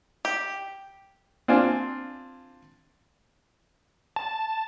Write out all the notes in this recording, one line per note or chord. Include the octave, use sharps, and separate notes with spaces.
G4
C4 D4 F4 G#5
A5